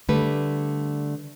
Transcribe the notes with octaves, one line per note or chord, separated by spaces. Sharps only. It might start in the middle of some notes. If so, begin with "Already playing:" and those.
D3 G3 A3 B4